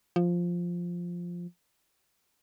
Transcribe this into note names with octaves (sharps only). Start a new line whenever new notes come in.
F3